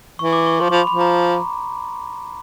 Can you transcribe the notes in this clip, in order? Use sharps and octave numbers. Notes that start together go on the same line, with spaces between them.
E3 C#6
D6
C#6
F3 C6
F3 B5
F3 B5
A#5